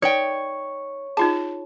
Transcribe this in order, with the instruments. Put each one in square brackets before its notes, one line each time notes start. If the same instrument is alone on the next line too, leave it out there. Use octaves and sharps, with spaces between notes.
[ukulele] D#4 D5 G5 [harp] C#5
[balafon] D#4 F4 G#4 [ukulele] A5